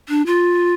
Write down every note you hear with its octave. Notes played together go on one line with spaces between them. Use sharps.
D4
F4